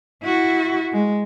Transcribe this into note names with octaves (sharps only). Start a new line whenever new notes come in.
E4 F#4
G#3